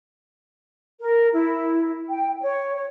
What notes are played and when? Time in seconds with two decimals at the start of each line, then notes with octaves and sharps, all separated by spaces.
1.00 A#4
1.32 E4
2.08 G5
2.41 C#5
2.76 C#5